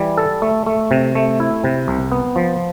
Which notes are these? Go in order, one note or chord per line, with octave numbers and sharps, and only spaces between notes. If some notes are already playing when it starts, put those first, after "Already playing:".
Already playing: E3 G3
A4
A3
A3
C3
A3
E4
C3
C2
B3
F3